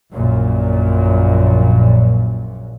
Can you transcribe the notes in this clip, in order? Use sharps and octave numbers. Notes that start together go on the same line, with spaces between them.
A#1 F#2 A#2